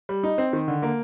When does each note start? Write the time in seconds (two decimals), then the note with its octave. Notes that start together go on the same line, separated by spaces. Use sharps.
0.09 G3
0.23 D#4
0.38 C4
0.53 D#3
0.68 D3
0.82 A#3